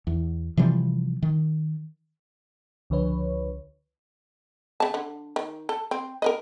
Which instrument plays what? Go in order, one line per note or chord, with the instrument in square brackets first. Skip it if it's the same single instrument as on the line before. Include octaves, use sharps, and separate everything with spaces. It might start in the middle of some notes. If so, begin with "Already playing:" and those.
[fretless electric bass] E2
C3 E3 F3 G3
D#3
[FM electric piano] C#2 D3 F3 B4 C#5
[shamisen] C#3 A5
D3
D#3
A4
C4
A#4 B4 D#5